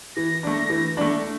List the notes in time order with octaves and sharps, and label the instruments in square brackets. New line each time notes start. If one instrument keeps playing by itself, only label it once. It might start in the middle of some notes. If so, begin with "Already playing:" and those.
[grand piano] E3 [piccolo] A#6
[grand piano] A3 D4
E3
A3 D4